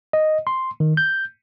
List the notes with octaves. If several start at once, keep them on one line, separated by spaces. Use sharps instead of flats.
D#5
C6
D#3
G6